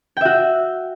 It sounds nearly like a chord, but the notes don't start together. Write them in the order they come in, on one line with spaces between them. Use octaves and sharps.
G5 E5 F#4